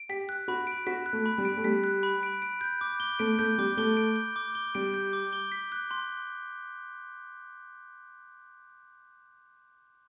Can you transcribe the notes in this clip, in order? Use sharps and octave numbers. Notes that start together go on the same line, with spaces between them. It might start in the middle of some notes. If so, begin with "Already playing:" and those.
Already playing: D7
G4 B6
F#6
F#4 B5
D7
F#4 B6
F#6
A3
B5
G3
D7
A3
G3 B6
F#6
B5
D7
D7
G6
D6
G7
A3 D7
A3 G6
G3 D6
A3 G7
D7
G6
D6
G7
G3 D7
G6
D6
G7
B6
F#6
C6